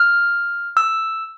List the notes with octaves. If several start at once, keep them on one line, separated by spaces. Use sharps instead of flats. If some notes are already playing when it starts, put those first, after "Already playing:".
Already playing: F6
E6